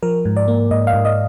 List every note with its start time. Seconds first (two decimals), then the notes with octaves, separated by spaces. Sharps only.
0.03 F3 A#4
0.25 G#2
0.37 D5
0.48 A#3
0.71 G#2 D#5
0.87 F5
0.93 G#2
1.05 D#5